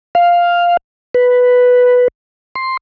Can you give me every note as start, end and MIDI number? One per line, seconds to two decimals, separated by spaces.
0.15 0.77 77
1.15 2.08 71
2.55 2.77 84